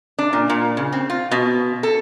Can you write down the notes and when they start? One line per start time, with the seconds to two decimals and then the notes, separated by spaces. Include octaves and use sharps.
0.19 D4
0.33 A#2
0.50 A#2
0.77 C#3
0.93 C4
1.10 F4
1.31 B2
1.83 A4